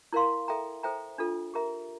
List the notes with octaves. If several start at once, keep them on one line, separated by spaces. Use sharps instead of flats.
E4 A#4 F5 C6
A4 E5 G5 A#5
A4 C5 E5 G5 A#5
D4 F4 A4
G4 A#4 E5 A#5